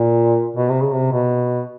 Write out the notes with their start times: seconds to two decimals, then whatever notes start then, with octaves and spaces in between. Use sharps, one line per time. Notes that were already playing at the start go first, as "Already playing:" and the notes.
Already playing: A#2
0.56 B2
0.69 C3
0.81 C#3
0.94 C3
1.12 B2